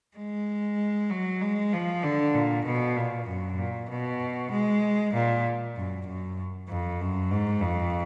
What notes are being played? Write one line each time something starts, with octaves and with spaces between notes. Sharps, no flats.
G#3
F#3
G#3
F3
D3
A#2
B2
A#2
F#2
A#2
B2
G#3
A#2
F#2
F#2
F2
F#2
G#2
F2